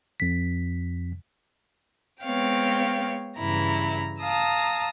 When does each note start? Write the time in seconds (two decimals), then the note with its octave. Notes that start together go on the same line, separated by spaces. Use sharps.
0.20 F2 B6
2.24 G#3 B3 C4 C#5 F5 G5
3.38 G2 C#3 E3 E4 A#5
4.22 F5 A5 A#5 D#6 E6